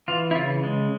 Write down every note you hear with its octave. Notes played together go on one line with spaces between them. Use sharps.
E3 F4
E4
C#3 F4
G#3